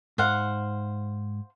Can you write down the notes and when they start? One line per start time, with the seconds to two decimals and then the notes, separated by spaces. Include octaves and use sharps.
0.18 G#2 C5 F5 F#5